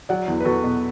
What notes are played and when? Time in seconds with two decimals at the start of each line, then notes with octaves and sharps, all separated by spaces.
0.09 F#3 D5 F#5
0.28 E2
0.40 B4
0.45 E2 F#4 A4
0.63 B2